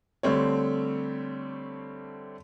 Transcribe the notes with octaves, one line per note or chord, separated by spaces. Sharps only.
D3 G3 A3 C4 C#5